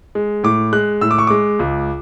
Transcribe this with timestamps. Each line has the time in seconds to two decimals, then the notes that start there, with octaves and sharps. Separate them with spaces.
0.15 G#3
0.44 A2 D6
0.73 G#3 F#6
1.01 A2 E6
1.11 D6
1.18 C#6
1.27 G#3 D6
1.59 C#2